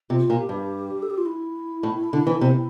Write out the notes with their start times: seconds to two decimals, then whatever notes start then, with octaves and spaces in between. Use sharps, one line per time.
0.10 C3 F4
0.30 A#2
0.39 G4
0.49 G2
1.02 A4
1.10 G4
1.18 F4
1.26 E4
1.83 A2
2.13 D3
2.27 E3
2.41 C3